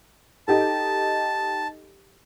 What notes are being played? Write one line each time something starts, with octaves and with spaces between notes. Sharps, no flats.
D#4 G4 A4 A5